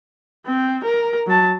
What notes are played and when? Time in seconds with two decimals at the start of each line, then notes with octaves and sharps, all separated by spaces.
0.46 C4
0.84 A#4
1.26 F#3 A5